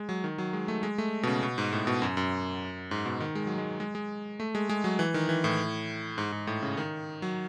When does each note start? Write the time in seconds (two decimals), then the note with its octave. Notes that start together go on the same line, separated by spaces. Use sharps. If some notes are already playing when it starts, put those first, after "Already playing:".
Already playing: G#3
0.09 F#3
0.24 D#3
0.38 F#3
0.53 G#3
0.68 A3
0.83 G#3
0.98 A3
1.23 B2
1.27 C#3
1.43 B2
1.58 G#2
1.72 A2
1.87 B2
2.02 F#2
2.17 F#2
2.91 G#2
3.06 B2
3.20 D#3
3.35 G#3
3.47 F#3
3.58 G#3
3.80 G#3
3.95 G#3
4.40 A3
4.55 G#3
4.69 G#3
4.84 F#3
4.99 E3
5.14 D#3
5.29 E3
5.44 A2
6.18 G#2
6.32 G#2
6.47 A2
6.62 C#3
6.77 D#3
7.22 F#3